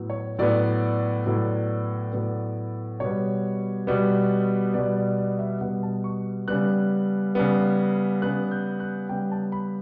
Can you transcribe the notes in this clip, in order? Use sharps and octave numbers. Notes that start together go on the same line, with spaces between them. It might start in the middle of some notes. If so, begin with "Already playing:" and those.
Already playing: A2 F#3 B3
C#5
A2 F#3 B3 D5
A2 F#3 B3
A2 F#3 B3
B2 G3 B3 C#5
B2 G3 B3
B2 G3 B3 D5
D5
D5
E5
B2 G3 B3 F#5
A5
C#6
C#3 G3 B3 F#6
C#3 G3 B3
C#3 G3 B3 F#6
G6
F#6
C#3 G3 B3 G5
A5
B5